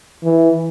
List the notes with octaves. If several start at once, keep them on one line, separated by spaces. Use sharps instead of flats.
E3